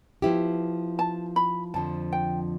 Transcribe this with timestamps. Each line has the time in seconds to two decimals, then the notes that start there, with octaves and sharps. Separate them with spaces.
0.22 F3 B3 E4 G4
0.99 A5
1.36 B5
1.74 F2 D3 F3 A5
2.12 G5